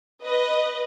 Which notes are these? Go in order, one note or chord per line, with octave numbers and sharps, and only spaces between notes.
B4 D#5